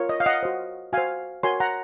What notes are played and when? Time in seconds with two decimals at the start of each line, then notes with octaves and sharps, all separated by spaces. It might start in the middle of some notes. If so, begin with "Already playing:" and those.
Already playing: F4 A#4 C#5
0.09 D#5
0.20 F5
0.26 D#5 F#5
0.43 F#4 C5
0.93 F#4 C5 F5 G#5
1.43 F#4 A#4 C#5 G#5 C6
1.60 F#5 A#5